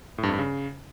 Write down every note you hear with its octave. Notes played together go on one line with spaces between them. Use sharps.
A2
G2
F2
G2
C#3